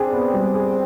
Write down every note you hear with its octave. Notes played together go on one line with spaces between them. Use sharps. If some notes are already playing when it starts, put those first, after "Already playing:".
Already playing: C4 D4 G#4
B3
G3
G#4